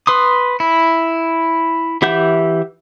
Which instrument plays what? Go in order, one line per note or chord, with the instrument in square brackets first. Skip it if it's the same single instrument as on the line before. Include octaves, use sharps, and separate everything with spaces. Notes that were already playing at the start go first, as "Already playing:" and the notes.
[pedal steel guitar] B4 C6 D#6
E4
E3 G4 E5 F#5 G6